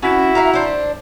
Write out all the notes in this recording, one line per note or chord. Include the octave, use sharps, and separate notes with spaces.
C#4 E4 F#4
E5 F5 A#5
D4 C5